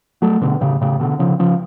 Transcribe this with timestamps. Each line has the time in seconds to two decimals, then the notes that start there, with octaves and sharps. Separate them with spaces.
0.22 F#3 A3
0.41 B2 D3
0.61 A2 C#3
0.81 A2 C#3
1.00 B2 D3
1.19 C#3 F3
1.39 C#3 F3